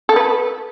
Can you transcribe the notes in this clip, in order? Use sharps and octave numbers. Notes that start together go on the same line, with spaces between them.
A4
B4